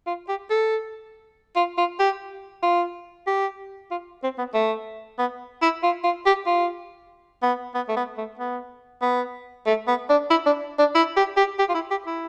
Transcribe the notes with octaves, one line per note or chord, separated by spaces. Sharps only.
F4
G4
A4
F4
F4
G4
F4
G4
F4
C4
B3
A3
B3
E4
F4
F4
G4
F4
B3
B3
A3
B3
A3
B3
B3
A3
B3
D4
E4
D4
D4
E4
G4
G4
G4
F4
E4
G4
E4